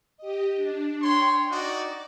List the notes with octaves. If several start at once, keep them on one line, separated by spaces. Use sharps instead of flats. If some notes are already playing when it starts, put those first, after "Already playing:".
G4 D#5
D4
C#5 G5 C6
D#4 F#4 D5 D6